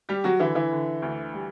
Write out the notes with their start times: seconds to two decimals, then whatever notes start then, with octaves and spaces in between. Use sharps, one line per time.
0.09 G3 G4
0.24 F#3 F#4
0.40 D3 E3 E4
0.55 E3 E4
0.72 D3
1.02 D2
1.33 G3